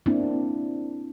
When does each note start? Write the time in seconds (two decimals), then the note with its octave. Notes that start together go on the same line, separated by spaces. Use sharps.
0.06 A#3 C4 D4 E4